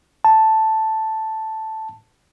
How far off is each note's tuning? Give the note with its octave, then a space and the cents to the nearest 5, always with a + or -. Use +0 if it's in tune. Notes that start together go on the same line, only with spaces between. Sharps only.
A5 +0